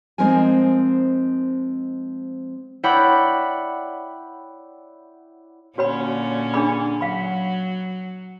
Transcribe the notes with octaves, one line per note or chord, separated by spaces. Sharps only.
F3 G#3 C4 D#4 A#4 G#5
E4 C#5 D5 F#5 G5 B5
A#2 D3 C#4 F#4 C#5 B5
D4 G#4 B5
F#3 F5 B5